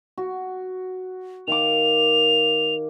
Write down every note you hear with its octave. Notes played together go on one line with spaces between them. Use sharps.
F#4
D#3 F5 D6 F7